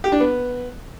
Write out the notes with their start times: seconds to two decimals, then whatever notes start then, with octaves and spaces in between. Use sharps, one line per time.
0.04 G4
0.12 D4
0.20 B3